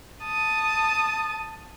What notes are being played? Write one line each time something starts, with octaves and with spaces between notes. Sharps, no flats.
A5 D#6